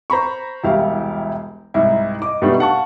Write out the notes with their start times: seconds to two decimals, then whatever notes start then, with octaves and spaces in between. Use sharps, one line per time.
0.10 C5 A#5 B5 C#6
0.64 E1 C2 E4 G4 F5
1.74 C2 G#2 E4
2.22 D#5 D6
2.42 B2 G3 A3 D4 D#4
2.59 F5 F#5 A5 C#6